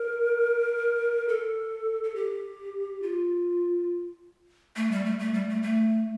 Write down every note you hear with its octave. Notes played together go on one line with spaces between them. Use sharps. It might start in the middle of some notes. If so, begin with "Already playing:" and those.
Already playing: A#4
A4
A4
G4
F4
A3
G3
A3
A3
G3
A3
A3